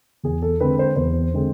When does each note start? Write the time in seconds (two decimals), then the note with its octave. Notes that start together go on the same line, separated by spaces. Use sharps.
0.24 E2 G#4
0.42 A4
0.60 D3 G#3 C4 B4
0.79 C5
0.96 E2 C5
1.34 D3 G#3 C4